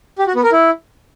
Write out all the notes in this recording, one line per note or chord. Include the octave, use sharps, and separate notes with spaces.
G4
F#4
B3
A#4
E4